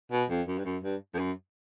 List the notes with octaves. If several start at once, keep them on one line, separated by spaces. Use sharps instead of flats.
B2
F2
F#2
G2
F#2
G2
F2
F#2